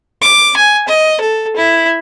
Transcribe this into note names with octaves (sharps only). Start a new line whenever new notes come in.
D6
G#5
D#5
A4
E4